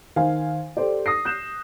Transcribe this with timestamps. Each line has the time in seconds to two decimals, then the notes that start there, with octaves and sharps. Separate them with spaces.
0.16 D#3 C5 F5 G#5
0.77 G4 A4 C5 D5
1.06 D#6 A#6 C7
1.25 F#6 G6 E7